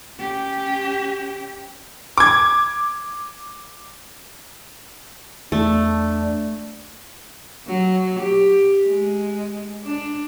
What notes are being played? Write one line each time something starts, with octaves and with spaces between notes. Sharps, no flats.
C#4 G4
D6 G#6
E2 A3 D4
F#3
G4
G#3
D4